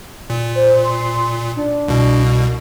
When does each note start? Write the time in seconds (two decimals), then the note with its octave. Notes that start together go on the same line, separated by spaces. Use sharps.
0.30 A#2
0.55 C5
0.84 C6
1.56 D4
1.88 C2 B2